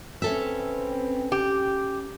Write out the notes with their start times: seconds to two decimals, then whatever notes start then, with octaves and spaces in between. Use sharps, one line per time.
0.22 C4 C#4 A4 B4 E5
1.32 G4